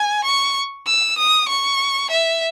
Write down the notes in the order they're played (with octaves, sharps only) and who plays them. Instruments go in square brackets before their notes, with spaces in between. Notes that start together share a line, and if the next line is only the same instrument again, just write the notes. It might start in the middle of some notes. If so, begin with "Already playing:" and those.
Already playing: [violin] G#5
C#6
E6
D#6
C#6
E5